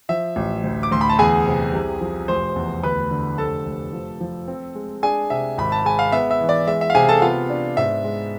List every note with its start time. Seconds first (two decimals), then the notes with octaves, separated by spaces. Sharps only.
0.09 F3 E5
0.36 A1
0.64 D2
0.83 D6
0.91 D2 C6
1.01 B5
1.09 A5
1.19 E2 G#4 G#5
1.46 C3
1.73 C2
2.01 F3
2.28 F1 C5 C6
2.56 E2
2.83 D2 B4 B5
3.11 D3
3.38 F1 A4 A5
3.65 F1
3.93 F3
4.20 F3
4.48 C4
4.75 G#3
5.03 D4 G#4 G#5
5.30 C3 E5
5.58 G#1 B5
5.72 A5
5.85 G#3 G#5
5.99 F5
6.12 B3 E5
6.31 E5
6.40 E3
6.49 D5
6.67 G#3 E5
6.81 E5
6.90 F5
6.95 C3 G#4 G#5
7.09 A4 A5
7.22 B3 F4 F5
7.50 D4
7.77 G#2 E5
8.04 G#3